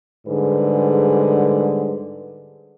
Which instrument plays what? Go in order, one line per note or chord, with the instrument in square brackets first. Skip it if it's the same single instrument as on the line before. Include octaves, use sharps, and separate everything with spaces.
[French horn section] G#2 D3 G3 G#4 B4